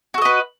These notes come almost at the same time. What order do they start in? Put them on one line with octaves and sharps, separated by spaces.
F#4 A4 D#5 B4